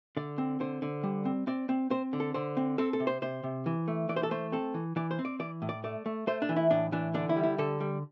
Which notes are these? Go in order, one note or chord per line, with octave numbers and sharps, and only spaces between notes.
D3 D5
C4
D3 C5
D3
G3
C4
C4 D5
C4
C4 C5
D3
A4
D3 C5
C4
C4 A4
A4
C3
C5
C3 C5
C3
E3
A3
E3 D5
C5
A4
A3 C5
C4 A4
E3
E3 D5
C5
C4
D5
E3 D5
A2
D5
A3 D5
A3
A3 C5
D4
E3
E4
A2 D4
E3 D4
D3 D4
E4
G3
E4
D3 A4
G3